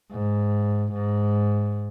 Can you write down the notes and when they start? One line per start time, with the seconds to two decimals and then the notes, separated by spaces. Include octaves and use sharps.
0.12 G#2
0.93 G#2